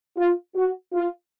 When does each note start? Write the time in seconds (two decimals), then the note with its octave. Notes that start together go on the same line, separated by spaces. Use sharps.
0.17 F4
0.56 F#4
0.94 F4